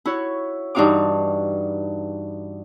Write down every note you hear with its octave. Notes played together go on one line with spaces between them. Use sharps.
E4 F#4 C#5
G2 E3 D#4 F#4 F5 D6